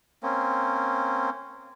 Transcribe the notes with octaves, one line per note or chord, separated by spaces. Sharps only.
A#3 C4 C#4